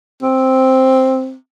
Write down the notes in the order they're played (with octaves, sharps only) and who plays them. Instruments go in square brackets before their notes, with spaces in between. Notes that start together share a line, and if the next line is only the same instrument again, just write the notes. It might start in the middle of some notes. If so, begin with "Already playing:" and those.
[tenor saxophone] C4